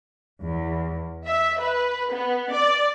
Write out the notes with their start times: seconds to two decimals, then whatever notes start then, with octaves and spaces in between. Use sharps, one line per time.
0.42 E2
1.27 E5
1.60 B4
2.13 B3
2.52 D5